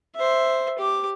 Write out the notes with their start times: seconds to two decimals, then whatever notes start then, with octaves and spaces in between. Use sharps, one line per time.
0.15 C5 E5
0.78 G4 D6